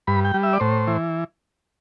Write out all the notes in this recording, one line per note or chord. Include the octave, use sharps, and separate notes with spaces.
G2 B5
G5
G3
E5
D5
A2 C5
E3